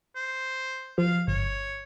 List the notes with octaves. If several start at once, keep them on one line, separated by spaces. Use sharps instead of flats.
C5
F3 F5
G1 C#5